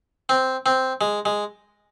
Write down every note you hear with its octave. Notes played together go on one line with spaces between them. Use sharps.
C4
C4
G#3
G#3